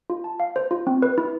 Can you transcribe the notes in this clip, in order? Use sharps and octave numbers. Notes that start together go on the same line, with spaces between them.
F4
A5
F5
C5
F4
C4
B4
E4